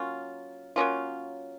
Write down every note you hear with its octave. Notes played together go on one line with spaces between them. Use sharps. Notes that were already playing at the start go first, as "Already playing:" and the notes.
Already playing: F#3 A#3 C#4 F4
F#3 A#3 C#4 F4